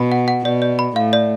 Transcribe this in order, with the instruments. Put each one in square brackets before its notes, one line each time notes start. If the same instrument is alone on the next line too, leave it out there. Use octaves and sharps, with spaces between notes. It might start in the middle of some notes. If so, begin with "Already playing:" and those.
Already playing: [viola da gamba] B2 [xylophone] B5
[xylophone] F#5
F#5
[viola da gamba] B2 [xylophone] D5
[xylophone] D5
B5
[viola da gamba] A2 [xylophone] F5
[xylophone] D5